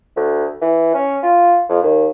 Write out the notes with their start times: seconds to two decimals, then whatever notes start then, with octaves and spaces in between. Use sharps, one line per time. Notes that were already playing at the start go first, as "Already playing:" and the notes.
0.16 D2
0.62 E3
0.94 C#4
1.23 F4
1.69 F2
1.83 D#2